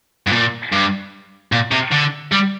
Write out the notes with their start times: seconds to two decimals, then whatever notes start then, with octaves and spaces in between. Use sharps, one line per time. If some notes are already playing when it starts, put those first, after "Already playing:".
0.27 G2
0.32 A#2
0.72 G2
1.52 A#2
1.72 C3
1.92 D3
2.32 G3